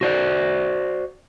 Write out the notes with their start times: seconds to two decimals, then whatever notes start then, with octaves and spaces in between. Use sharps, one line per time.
0.01 F#4 C5 D5